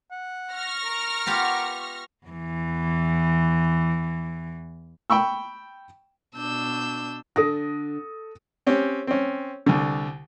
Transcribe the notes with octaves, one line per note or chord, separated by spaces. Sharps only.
F#5
C#6 F6 A#6
A#4
B3 F4 G4
E2 E3
G5 B5 C#6 E6
B2 D4 E6 G6
D3 D4 A4 D#6 A#6
C4 C#4 G4
C4 C#4
C2 D3